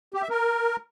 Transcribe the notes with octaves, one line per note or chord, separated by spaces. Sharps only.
G4
E5
A#4